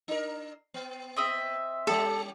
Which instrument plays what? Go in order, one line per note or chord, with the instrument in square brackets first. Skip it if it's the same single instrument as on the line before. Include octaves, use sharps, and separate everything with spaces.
[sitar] D4 A#4
B3
[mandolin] C4 D#5 E5
[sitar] G3 C#4 G4 [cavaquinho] A4